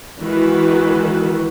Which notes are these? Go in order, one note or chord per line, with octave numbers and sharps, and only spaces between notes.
D#3 E3 G#3 F#4 B4